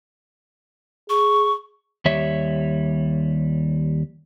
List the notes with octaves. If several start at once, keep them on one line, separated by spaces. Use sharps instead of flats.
G#4 C#6
D#2 G3 C#5 E5